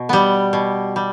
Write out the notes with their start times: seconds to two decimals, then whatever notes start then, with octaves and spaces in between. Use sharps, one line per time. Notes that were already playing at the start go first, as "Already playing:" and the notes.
Already playing: B2
0.09 G3 B3
0.53 B2
0.96 G3